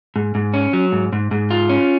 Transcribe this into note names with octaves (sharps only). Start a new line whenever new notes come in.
G#2
G#2
C#4
F#3
G#2
G#2
G#2
F4
C#4